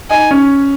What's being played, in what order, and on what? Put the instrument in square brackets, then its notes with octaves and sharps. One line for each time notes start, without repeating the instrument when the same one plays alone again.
[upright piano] D#4 [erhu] G#5
[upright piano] C#4